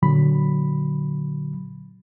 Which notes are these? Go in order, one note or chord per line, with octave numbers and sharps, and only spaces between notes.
A#2 D3 F#3 B5